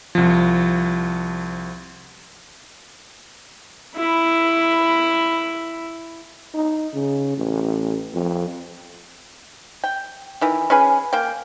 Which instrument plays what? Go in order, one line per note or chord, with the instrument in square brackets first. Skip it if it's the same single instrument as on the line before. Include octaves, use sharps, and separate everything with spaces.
[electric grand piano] C2 F3
[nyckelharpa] E4 B5
[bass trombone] D#4
C#3
A1
F2
[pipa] G5
D#3 E3
C#4 G#4 B4 G#5
A#3 G5